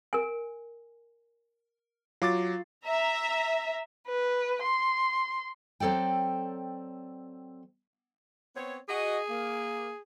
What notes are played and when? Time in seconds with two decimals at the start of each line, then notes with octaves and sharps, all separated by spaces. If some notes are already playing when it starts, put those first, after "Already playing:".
0.13 A#4 G#5
2.22 F#3 F4 D6 A6
2.86 E5 A#5
4.07 B4
4.63 C6
5.80 F#3 C4 A4 D5 G5
8.55 B3 C4 C#5
8.89 F#4 G#4 D#5
9.29 A#3